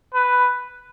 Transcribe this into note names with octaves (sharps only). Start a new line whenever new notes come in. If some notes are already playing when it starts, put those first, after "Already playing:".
B4